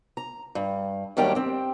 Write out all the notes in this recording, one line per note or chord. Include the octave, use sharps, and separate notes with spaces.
A#5
G2
D#2 F#3 G3 D4 A#4 G5
C4 G4